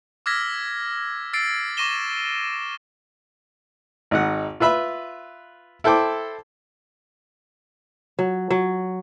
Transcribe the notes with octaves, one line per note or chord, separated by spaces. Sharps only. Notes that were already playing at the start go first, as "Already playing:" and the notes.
D6 E6 F6 G#6 A#6 B6
E6 A6 C7 D7
C#6 D6 A#6 D#7 E7 G7
G#1 D#4 F#5
F4 B4 E5 B5
E4 A4 C5 G5 D6
F#3
F#3